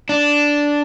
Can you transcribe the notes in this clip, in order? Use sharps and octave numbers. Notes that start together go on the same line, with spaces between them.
D4